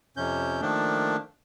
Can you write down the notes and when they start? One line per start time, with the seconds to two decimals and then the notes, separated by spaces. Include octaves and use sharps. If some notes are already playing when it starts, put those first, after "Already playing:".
0.17 F2 C3 C#4 G6
0.61 D#3 F3 A3 A#3 D4